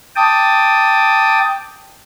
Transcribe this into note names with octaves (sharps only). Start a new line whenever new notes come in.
G5 A5 D6 D#6